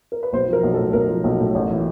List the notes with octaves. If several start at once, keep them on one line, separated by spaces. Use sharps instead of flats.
A#4
B4
B1 C5
F3 A#4
B1
A2 A4
B1 A#4
F3
B1
A2
A1
E3